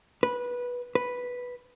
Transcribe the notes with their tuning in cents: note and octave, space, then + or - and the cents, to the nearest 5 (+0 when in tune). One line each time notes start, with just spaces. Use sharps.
B4 -15
B4 -5